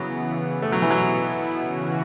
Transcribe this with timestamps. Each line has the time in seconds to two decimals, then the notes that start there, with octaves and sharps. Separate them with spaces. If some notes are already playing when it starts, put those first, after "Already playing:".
Already playing: C#3 E3 F#3 B3
0.62 B2 A3 B3 E4
0.72 F#3
0.82 E3
0.91 F#3
1.57 C#3 E3 C#4 F#4